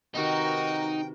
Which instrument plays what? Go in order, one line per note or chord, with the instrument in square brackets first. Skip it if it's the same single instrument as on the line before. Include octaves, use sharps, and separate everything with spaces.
[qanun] C3 D#3 B4 [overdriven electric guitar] D#4 [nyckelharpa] F#4 A#4 [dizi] G5